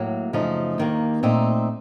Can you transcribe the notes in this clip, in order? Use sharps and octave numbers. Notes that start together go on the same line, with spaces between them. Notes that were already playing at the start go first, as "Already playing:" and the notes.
Already playing: A2 F#3 A#3
F#2 C#3 F3 A3 D#4
D#2 D#3 A#3
A#2 A3 C4 D#4